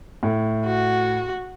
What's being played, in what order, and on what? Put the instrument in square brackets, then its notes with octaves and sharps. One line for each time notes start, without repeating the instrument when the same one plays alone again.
[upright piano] A2
[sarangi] F#4